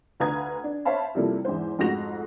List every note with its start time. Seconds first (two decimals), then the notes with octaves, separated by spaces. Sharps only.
0.20 D2 B4 F5 A#5 D#6 G#6
0.64 D4
0.85 C5 C#5 E5 F5 A5 B5
1.15 C3 F3 G3 A#3 E4 A4
1.45 E2 G#2 E4 C5
1.78 F2 G#2 A3 F#4 A#6 F7